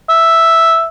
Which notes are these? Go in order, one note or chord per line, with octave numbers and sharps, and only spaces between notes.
E5